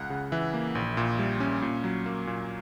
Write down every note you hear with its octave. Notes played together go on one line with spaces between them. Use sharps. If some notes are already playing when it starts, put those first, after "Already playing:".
Already playing: C#2 F#5
C#3
E3 E5
A#3
A#1
A#2
G3
C#4
A#2
F#3
A#3
A#2